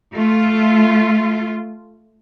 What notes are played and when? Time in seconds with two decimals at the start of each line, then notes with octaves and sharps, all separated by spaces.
0.15 A3 F4